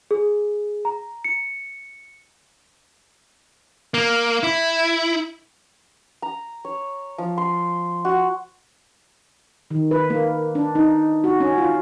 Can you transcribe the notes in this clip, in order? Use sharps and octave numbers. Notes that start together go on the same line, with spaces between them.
G#4
A#5
C#7
A#3
E4
A#5
C#5
F3
C6
F#4
D#3
B4
A#3
D4
D#4
F#4
C#4
F4